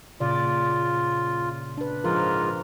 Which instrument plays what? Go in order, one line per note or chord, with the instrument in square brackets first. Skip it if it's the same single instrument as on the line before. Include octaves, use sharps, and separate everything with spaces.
[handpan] A#2 C#3 D5 [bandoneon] F4
[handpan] D4 B4
[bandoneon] G#2 F4 [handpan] F3 A#4